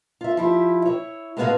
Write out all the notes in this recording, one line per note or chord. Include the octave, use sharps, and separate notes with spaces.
F4 E5
F3 E4 G4
E4 C#5
A2 G#3 B3 C4 F#4 F5